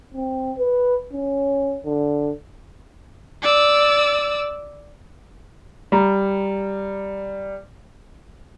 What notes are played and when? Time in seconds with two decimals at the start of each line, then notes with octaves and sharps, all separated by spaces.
0.14 C4
0.58 B4
1.13 C#4
1.85 D3
3.43 D5 E6
5.92 G3 A#5